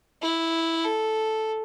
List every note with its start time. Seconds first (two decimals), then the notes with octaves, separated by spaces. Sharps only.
0.22 E4
0.85 A4